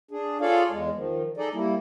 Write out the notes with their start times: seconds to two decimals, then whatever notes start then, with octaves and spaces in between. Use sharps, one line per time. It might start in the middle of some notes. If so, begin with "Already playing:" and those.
0.11 D4 G#4
0.41 F4 G#4 A4 C#5 D5 F5
0.70 E2 G#3
0.95 D#3 F3
1.37 D#4 G#4 A4 D5 D#5
1.53 G3 A#3 E4